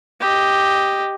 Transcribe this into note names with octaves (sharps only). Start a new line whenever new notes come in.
G4 D#5